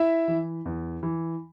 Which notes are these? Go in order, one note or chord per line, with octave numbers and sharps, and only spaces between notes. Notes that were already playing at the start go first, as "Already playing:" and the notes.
Already playing: E4 E5
E3
E2
E3